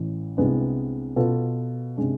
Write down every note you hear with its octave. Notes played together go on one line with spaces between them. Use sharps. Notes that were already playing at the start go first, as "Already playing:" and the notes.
Already playing: A1 A2 E3
C2 C3 G#3 B3 D4
B2 B3 F4 A4
C3 G#3 D4